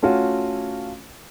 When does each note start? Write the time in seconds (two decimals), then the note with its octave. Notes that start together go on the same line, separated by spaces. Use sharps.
0.02 A3 C#4 F4 F#4